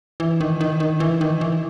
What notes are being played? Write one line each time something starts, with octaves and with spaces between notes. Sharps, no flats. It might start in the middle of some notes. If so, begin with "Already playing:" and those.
E3
D#3
D#3
D#3
E3
D#3
E3